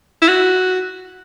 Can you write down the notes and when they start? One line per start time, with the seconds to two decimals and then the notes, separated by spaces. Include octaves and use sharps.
0.22 E4
0.28 F#4